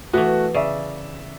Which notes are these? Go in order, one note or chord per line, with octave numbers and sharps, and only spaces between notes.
E3 A3 B3 F#4
C#3 D5 E5